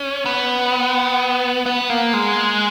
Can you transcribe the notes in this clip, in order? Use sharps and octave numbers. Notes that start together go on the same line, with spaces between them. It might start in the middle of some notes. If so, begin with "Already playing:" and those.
Already playing: C#4
B3
B3
A#3
G#3